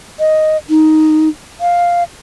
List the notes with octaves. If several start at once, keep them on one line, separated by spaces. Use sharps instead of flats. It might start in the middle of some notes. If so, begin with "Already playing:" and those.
D#5
D#4
F5